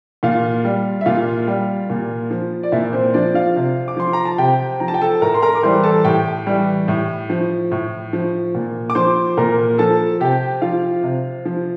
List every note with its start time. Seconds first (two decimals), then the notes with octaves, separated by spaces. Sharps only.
0.23 A#2 F4 F5
0.64 G3
1.01 E5
1.06 A#2 F4 F5
1.47 G3
1.90 A#2
2.31 F3
2.63 D5
2.72 A#2 E4 E5
2.93 C4 C5
3.14 F3 D4 D5
3.34 F4 F5
3.56 C3
3.88 D6
3.97 F3 C6
4.13 A#5
4.25 A5
4.38 C3 G4 G5
4.80 F3 A#5
4.88 A5
4.94 G5
5.02 A4 A5
5.21 A2 A#4 A#5
5.34 C6
5.42 A#4 A#5
5.55 D6
5.63 E3 G3 C5 C6
5.84 A4 A5
6.05 A2 G4 G5
6.47 E3 G3
6.88 A2
7.30 F3
7.71 A2
8.13 F3
8.55 A#2
8.90 D6
8.95 F3 C5 C6
9.37 A#2 A#4 A#5
9.78 F3 A4 A5
10.20 C3 G4 G5
10.62 F3 F4 F5
11.03 C3
11.45 F3